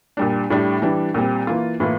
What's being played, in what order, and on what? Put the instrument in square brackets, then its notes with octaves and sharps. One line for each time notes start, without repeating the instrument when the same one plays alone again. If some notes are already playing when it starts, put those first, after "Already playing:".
[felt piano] A#2 G3 D4
A2 G3 D4 G4
E3 G3 D4
A#2 G3 C4
E3 A#3 F4
A2 E3 A#3 F4